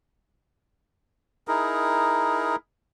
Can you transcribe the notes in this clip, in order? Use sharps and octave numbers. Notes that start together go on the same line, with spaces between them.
D#4 E4 G#4 A#4